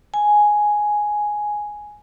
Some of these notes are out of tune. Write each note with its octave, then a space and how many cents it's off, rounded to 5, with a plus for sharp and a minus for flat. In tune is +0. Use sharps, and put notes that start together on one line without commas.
G#5 +5